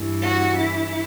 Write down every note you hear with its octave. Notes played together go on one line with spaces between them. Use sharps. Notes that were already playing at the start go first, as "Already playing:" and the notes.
Already playing: G2 E3
F#4
E4